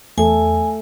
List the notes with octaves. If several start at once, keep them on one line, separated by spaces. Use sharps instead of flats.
E2 A3 A4 G#5